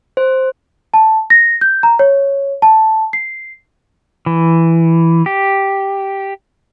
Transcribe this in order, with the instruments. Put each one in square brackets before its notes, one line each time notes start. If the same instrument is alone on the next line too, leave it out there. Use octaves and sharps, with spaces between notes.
[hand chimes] C5
[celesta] A5
A#6
G6
A#5
C#5
A5
C7
[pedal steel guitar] E3
G4